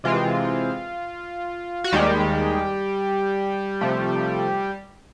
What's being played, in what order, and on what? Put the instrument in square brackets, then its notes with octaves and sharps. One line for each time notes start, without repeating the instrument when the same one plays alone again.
[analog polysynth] C3 E3 G#3 C4 F4
F#4
D#2 D#3 G3 G#3 G4
C3 F3 A3